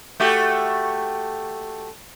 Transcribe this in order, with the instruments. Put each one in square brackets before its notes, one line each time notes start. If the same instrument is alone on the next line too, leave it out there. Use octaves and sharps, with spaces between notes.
[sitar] A3 F#4 G4